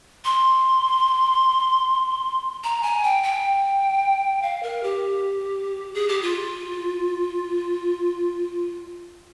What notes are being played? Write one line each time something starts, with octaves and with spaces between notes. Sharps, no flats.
C6
A#5
G#5
G5
G5
F5
A#4
G4
G#4
G4
F4